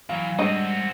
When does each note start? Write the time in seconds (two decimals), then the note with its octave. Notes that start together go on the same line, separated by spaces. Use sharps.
0.09 E3 F#3 F5
0.39 G3 G#3 C4 D4 F#4 D#5